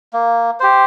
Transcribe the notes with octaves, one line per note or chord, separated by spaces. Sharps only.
A#3
G4 C5